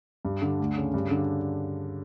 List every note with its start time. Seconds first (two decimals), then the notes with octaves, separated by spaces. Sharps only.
0.25 G2
0.42 D3
0.60 D2
0.77 C#3
0.94 G2
1.11 D3